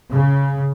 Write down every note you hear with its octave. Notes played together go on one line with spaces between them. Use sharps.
C#3